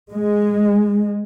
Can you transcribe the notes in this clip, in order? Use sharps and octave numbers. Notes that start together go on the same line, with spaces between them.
G#3